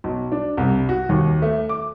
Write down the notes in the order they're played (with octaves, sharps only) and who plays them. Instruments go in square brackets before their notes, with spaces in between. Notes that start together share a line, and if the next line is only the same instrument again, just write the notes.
[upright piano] B1
D4
C2
F#4
D#2
A3
D6